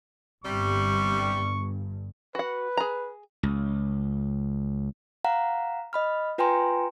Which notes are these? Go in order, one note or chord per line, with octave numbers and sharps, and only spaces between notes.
G1 G2 C3 G3 C#6
F#4 B4 F#5
G#4 A#5
C#2
F5 F#5 A#5
D#5 B5 F6
F4 B4 G5 G#5 A#5 C6